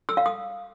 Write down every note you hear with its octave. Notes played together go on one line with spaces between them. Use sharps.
E6
F5
D#6